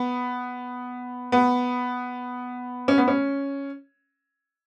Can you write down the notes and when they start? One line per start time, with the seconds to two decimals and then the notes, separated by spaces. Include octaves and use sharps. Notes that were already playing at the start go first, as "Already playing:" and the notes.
Already playing: B3
1.32 B3
2.88 C#4
2.98 B3
3.08 C#4